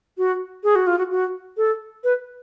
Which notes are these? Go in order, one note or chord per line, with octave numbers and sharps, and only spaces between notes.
F#4
G#4
F#4
F4
F#4
F#4
A4
B4